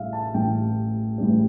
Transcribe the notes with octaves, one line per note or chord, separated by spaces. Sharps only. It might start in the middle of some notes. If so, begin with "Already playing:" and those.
Already playing: A1 A2 G3 E5 F5
A5
A1 A2 G3 G5
A1 A2 G3